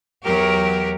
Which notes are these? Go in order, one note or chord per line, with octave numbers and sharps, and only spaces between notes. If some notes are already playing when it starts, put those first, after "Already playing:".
E2 F#3 G4 A#4